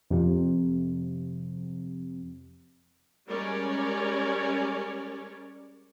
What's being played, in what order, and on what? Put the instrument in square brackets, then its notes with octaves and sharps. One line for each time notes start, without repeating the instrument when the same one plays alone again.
[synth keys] F2 C3
[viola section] G3 G#3 C#4 A#4 C#5 D5